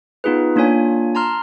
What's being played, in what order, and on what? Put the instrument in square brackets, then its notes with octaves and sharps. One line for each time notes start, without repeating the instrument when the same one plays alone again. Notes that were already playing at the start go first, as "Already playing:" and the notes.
[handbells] B3 D#4 F4 G#4 B4
A#3 D4 F4 C#5 G#5
A5 A#5 C6 F6